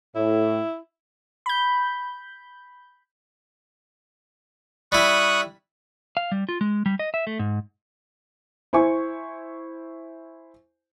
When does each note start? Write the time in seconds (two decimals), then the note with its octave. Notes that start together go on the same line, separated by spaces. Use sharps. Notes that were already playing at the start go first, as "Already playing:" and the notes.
0.16 A2 E4
1.46 B5 G6
4.92 G3 E4 C#6 D#6 F#6
6.17 F5
6.32 G3
6.49 F4
6.61 G#3
6.86 G3
6.99 D#5
7.14 E5
7.27 A3
7.39 G#2
8.73 E4 C5 G#5 C#6